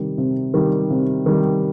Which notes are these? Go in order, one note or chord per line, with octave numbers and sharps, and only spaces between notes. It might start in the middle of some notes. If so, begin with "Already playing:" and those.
Already playing: C3 D#3 G3
C3
D#3 G3
C3
D#3 G3